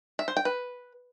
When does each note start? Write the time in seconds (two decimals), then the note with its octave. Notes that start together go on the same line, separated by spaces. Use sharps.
0.19 E5
0.28 C5
0.37 G5
0.45 B4